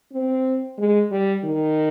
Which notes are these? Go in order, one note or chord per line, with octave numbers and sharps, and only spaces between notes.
C4
G#3
G3
D#3